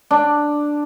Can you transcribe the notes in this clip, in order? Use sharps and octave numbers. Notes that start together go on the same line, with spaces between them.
D4